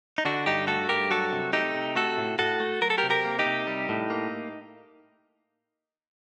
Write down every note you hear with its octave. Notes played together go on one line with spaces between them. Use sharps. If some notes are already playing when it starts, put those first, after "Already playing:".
D#4
D3 D4 F#4
G2 D#4 G4
A3 F#4 A4
G2 G4 A#4
F#3 F#4 A4
C3
A3 D#4 G4
C3
A3 F#4 A4
A2
A2 F#4 A4
A3
F#3 A#4
A4
G4 A#4
C3
G4 A#4
A#3
D#4 G4
C3
G3
A2
A#3